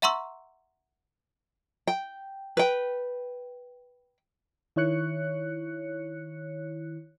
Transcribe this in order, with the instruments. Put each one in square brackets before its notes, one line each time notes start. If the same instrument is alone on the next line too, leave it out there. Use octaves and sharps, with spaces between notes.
[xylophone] E5 F#5 A#5 C6 C#6 E6
[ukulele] G5
B4 G5
[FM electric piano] D#3 E4 C#5 F#6 C#7